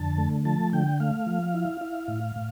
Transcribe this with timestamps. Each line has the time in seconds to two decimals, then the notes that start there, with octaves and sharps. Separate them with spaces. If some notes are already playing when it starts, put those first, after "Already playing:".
Already playing: F2 D3 A5
0.18 A3
0.45 F3 A5
0.73 D3 G5
1.00 A3 F5
1.27 F3
1.55 E4
1.81 E4
2.08 A2
2.36 A2